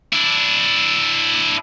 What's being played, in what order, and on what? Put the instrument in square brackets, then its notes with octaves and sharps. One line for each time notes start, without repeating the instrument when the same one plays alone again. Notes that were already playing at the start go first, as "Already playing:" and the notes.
[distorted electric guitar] D4 E4